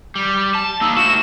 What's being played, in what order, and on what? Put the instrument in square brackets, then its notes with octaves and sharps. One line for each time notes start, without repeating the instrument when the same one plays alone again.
[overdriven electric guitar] G3
A5
[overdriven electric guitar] A#3 D#4 [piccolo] E6
[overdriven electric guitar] A3 F#4 [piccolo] E7